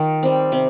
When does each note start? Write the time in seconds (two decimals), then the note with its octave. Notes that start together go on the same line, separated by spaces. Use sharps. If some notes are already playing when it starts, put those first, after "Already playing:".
Already playing: D#3 F4
0.23 G3 C4
0.52 C3